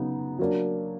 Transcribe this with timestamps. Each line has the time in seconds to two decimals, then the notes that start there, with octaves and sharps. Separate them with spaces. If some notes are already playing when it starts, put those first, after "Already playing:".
Already playing: C#3 F#3 B3 D#4
0.39 F#3 A#3 D4